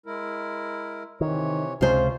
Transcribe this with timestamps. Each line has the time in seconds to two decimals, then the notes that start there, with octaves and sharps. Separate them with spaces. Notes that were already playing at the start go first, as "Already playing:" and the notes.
0.06 G#3 E4 A#4
1.21 C3 D#3 E3 C#5
1.81 C#2 C3 F3 G#3 C#4 F4 C5